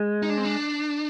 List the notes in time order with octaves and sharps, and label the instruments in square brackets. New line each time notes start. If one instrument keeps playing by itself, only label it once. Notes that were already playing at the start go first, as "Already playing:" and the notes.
Already playing: [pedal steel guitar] G#3
[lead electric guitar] D#4
D4
C4
D4